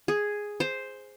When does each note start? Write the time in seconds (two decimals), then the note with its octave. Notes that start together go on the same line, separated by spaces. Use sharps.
0.08 G#4
0.60 C5